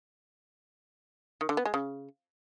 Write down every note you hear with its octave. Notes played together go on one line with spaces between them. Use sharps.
D#3
D3
B3
G#3
C#3